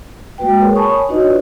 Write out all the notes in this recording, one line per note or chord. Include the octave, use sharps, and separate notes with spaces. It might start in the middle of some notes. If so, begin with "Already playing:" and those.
G#3 A#3 F#4 B4 G5
G#4 A#4 C#5
C#5 G#5 A5 B5 C#6 D#6
D#6
D4 D#4 F#4 B4 C#5 D#5
F4 D5